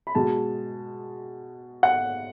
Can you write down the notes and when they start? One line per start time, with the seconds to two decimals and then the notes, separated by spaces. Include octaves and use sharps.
0.07 B5
0.15 B2 G#3 A5
1.83 F#5